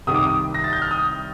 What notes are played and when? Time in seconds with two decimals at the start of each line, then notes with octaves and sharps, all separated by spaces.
0.07 C2 C3 D#3 D#6
0.14 D6
0.23 D#6
0.55 A#6
0.64 A6
0.73 G6
0.82 F6
0.91 D#6